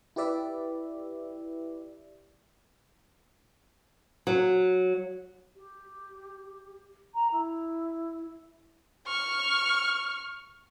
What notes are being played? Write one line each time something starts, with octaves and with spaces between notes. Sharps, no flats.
E4 G4 B4 D5 E5
F#3
G4
A#5
E4
C#6 F6